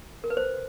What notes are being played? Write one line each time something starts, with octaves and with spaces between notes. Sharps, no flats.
A#4
B4
C5